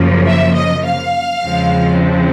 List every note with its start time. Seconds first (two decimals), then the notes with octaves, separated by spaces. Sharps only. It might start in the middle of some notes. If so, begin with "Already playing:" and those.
Already playing: F#2 C#3 F3 A#3
0.26 E5
0.55 D#5
0.85 F5
1.44 E2 C#3 F3 G#3 C4